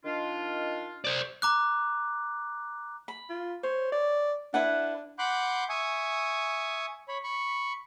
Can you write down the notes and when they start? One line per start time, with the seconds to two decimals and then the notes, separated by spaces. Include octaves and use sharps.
0.04 D#3 D4 F4
1.05 C5 D5
1.42 A#5 D6 F#6
3.08 B5
3.30 F4
3.63 C5 C#5
3.92 D5
4.54 D4 E4 B4 F#5
5.19 F#5 B5 C6 D6 F#6 G6
5.69 E5 G#5 C#6 D#6
7.08 C#5 B5
7.23 B5 C#6